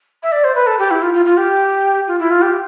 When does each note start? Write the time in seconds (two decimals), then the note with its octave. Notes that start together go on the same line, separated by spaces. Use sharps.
0.23 E5
0.32 D5
0.44 C5
0.55 B4
0.67 A4
0.79 G4
0.91 E4
1.02 F4
1.14 F4
1.25 F4
1.37 G4
2.07 F4
2.19 E4
2.30 F4
2.42 G4